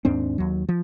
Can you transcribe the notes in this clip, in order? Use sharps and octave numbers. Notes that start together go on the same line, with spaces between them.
D#2 G#2 C4 D4
D#2 F#3
F3